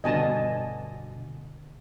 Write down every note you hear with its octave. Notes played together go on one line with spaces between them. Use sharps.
G2 B2 D3 D#5 G#5 A5